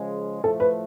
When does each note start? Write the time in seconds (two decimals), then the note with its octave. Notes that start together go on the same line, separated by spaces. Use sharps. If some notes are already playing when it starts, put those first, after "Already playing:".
Already playing: C#3 F3 G#3
0.44 A2 F3 A3 A4
0.60 B4